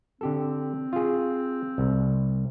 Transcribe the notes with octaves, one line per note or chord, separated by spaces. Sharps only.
D3 C4 G4 A4
F4 G#4
C2